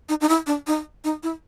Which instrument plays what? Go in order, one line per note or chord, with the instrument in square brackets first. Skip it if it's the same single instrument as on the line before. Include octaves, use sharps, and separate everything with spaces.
[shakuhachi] D#4
D#4
E4
D4
D#4
D#4
E4